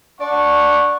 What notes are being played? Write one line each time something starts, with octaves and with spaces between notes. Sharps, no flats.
D4 D5 F#5 C#6